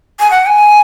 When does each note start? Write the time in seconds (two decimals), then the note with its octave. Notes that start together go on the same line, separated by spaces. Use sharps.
0.19 G#5
0.30 F#5
0.46 G#5